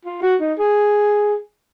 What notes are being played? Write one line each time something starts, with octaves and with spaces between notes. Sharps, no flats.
F4
F#4
D#4
G#4